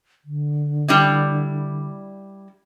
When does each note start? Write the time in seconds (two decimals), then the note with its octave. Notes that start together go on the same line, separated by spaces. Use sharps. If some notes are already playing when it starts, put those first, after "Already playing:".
0.25 D3
0.88 G3 D4 E4